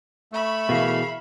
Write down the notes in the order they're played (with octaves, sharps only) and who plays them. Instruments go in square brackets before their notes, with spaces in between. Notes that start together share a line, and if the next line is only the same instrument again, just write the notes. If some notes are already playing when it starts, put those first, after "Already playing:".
[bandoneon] A3 [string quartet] E5 B5 C#6
[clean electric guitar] B2 E3 [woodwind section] G#4 A#4 F5